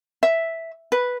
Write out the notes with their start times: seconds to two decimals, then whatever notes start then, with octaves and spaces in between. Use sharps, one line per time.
0.23 E5
0.92 B4